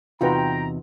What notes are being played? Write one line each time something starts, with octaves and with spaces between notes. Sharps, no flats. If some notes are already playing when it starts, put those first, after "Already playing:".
E2 C3 D#4 F4 F#4 B4 G5 A#5